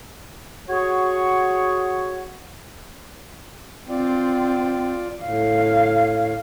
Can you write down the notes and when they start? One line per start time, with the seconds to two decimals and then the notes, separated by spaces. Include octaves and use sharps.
0.68 F#4 G#4 C#5 F#5
3.90 C4 F4 D5
5.24 A2 F5